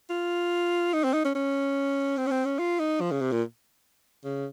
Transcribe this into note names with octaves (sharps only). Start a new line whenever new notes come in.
F4
D#4
C4
D#4
C#4
C#4
C4
C#4
C4
C#4
F4
D#4
F3
C#3
C3
A#2
C#3